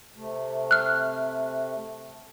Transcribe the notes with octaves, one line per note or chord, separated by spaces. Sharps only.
C3 A3
F6 F#6